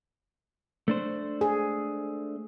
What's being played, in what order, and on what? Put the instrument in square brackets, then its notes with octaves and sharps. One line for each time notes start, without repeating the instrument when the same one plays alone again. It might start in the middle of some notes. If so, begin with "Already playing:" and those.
[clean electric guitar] A3 D4 C5
[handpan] G#4